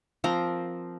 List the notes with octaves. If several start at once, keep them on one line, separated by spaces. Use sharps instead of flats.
F3 C4 A#4 A#5